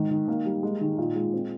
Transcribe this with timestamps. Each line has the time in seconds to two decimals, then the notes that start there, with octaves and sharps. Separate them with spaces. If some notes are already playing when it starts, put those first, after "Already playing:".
Already playing: G#2 D#3
0.11 D#3
0.28 A#3
0.45 G3
0.63 G#3
0.81 D#3
0.98 A#2
1.15 G#3
1.34 C4